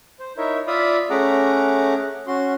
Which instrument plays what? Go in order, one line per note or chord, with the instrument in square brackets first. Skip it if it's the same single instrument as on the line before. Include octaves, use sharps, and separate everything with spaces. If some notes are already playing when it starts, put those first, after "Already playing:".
[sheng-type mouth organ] C5
D#4 E4 A#4 C#5 E5
F4 D5 E5 F5 B5 D#6
A3 C#4 G#4 F#5 A#5 D6
C#4 F#4 C6